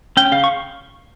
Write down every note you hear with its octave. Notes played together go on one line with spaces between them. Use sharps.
C#4 G5
C#3 F5
C#6